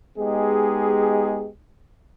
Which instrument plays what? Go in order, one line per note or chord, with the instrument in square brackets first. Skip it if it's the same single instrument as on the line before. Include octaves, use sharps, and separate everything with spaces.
[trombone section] G#3 B3 D#4 G4 G#4